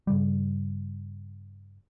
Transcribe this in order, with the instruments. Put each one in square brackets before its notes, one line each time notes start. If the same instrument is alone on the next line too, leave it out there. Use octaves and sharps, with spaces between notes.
[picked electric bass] G2 C#3 G3